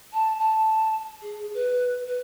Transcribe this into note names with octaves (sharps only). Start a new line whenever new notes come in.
A5
A5
G#4
B4
B4